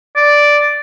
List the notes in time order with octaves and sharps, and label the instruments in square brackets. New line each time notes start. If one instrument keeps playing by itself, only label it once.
[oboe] D5